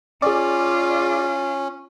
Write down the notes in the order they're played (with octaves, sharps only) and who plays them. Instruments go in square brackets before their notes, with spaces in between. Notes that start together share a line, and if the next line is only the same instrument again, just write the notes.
[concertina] C#4 [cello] F4 [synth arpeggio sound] G#4 D5